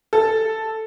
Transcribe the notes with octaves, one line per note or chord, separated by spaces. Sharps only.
A4